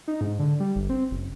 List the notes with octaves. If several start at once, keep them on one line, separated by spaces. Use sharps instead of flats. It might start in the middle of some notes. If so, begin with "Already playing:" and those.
D#4
G#2
D3
G3
G1
C4
F#1